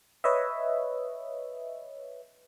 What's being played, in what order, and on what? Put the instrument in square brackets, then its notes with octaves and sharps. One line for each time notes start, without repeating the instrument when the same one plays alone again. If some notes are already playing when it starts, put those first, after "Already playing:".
[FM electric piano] B4 C#5 D#5 E5